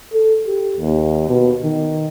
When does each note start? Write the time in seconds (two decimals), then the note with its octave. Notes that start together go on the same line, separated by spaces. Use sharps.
0.14 A4
0.47 G4
0.77 D#2
1.29 B2
1.63 D#3